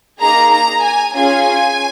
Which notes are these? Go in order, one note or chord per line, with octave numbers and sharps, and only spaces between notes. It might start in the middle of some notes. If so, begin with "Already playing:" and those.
A#3 D#4 G#4 A#5
A#5
G#5
C#4 F4 G#4 G#5